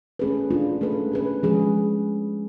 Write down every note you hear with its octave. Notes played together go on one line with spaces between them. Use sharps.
A3 C#4 G#4 B4
A3 D4 F4
A3 C#4 G#4 B4
A3 C#4 G#4 B4
F3 G#3 C#4 G#4